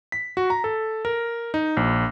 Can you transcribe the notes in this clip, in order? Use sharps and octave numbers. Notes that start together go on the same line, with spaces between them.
B6
F#4
A#5
A4
A#4
D#4
A#1